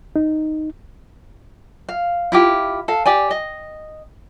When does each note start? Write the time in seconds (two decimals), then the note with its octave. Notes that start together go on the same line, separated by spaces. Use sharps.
0.16 D#4
1.89 F5
2.32 E4 F4 G4
2.88 A4 F5
3.06 G4 D5 G#5
3.31 D#5